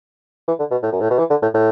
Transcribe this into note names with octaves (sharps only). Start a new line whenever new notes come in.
E3
D3
B2
A2
F#2
A2
B2
E3
D3
A2
A2